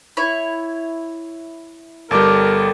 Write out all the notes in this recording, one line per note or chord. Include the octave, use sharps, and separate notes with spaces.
E4 C#5
G1 G3 A4 A#4 D5 G5